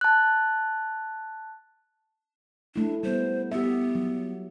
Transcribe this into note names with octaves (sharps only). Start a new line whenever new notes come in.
A5 F#6
A3 D4 E4
G3 B3 C5
B3 G4 E5
F#3